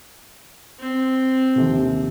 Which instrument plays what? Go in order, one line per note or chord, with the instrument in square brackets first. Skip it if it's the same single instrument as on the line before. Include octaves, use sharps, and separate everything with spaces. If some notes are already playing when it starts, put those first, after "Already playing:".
[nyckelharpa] C4
[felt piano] A#1 D#2 C3